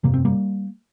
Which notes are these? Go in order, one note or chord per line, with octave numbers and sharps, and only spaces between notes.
G1 F2 C3 A#3
C4
G3 A#3